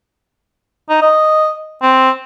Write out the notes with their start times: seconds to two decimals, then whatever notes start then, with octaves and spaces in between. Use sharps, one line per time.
0.90 D#4
1.02 D#5
1.82 C4